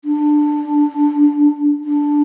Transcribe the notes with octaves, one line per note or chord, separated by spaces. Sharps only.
D4
D4